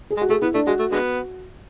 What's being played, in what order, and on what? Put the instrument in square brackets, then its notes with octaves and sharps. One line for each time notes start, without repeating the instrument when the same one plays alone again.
[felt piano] G#4
[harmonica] G#3
[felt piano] F#4
[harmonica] A3 [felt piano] G#4
[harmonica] B3 [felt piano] E4
[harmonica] A3 [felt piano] D4
[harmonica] G#3 [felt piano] F#4
[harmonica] A3
D3 G#3 B3